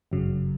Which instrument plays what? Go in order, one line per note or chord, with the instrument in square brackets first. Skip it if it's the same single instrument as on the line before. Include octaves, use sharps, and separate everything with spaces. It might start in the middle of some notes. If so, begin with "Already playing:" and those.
[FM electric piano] G1 F#2 C#3 F#3